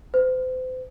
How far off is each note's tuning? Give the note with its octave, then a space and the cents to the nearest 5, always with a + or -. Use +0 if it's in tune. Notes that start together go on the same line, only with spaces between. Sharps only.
C5 -35